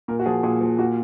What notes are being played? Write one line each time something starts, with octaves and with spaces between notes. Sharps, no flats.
A#2 A#4
F#4
F3 G#4
A#2 G#4
F3
A#2 F#4